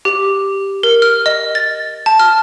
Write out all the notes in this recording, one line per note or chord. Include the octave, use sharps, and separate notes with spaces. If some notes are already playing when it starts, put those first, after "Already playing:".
G4
A#4
F6
D#5
A6
A5
F6